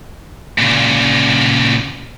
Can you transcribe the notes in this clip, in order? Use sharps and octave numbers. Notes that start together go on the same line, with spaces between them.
A#2 C#3